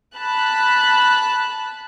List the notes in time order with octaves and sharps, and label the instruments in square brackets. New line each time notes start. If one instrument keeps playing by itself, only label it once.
[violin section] A5 B5 F#6